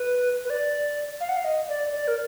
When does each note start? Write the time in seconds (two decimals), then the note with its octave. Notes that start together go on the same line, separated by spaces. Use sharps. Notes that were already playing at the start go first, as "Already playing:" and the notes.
Already playing: B4
0.45 B4
0.50 D5
1.20 F5
1.29 F#5
1.37 F5
1.45 D#5
1.69 D5
1.92 D5
2.08 A#4